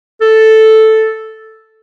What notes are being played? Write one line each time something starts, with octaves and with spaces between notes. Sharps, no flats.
A4